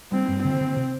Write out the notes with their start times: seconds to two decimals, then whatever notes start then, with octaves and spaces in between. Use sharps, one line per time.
0.12 G3 C4
0.28 G2
0.44 D3 C4
0.61 D3
0.76 C3